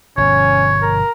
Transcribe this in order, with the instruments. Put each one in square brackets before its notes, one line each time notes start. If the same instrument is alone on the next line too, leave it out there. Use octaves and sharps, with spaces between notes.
[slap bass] G1 B2 F3 [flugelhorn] C#4 [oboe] C#5
[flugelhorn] A#4